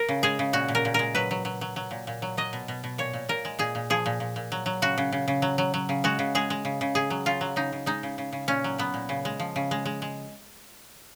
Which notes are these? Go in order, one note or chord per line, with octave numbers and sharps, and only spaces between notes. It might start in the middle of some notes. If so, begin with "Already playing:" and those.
Already playing: A#4
C#3
G#3 G#4
C#3
A#2 F#4
A#2
A#4
A#2
G#3 A#4
F#3 B4
F#3
F#3
F#3
F#3
A#2
A#2
F#3
F#3 D#5
B2
B2
B2
A#2 C#5
A#2
A#2 A#4
G#3
A#2 G#4
A#2
F3 G#4
A#2
A#2
A#2
F#3
F#3
C#3 F#4
C#3
C#3
C#3
F#3
F#3
F#3
C#3
G#3 F#4
C#3
G#3 G#4
G#3
C#3
C#3
C#3 G#4
F#3
C#3 F4
F#3
C#3 D#4
C#3
G#3 D#4
C#3
C#3
C#3
A#2 C#4
F#3
F#3 B3
A#2
C#3
G#3
F3
C#3
G#3
G#3
G#3